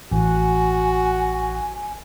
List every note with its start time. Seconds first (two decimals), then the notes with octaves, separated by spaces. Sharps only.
0.12 A1 F#4 G#5